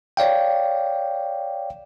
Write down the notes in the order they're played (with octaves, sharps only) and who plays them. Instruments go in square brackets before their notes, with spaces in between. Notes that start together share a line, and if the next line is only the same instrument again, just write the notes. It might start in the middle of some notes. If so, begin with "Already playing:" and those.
[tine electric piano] C#5 D5 F5 G5